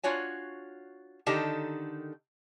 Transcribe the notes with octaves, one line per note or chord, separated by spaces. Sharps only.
D4 F4 F#4 C#5 G#5
D3 D#3 D#4 G4 A4